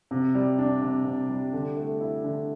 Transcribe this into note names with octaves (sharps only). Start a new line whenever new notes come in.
C3
G3
D4
C3
C3
G3
D3
A3
E4
D3